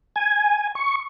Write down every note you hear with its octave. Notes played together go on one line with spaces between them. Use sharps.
G#5
C#6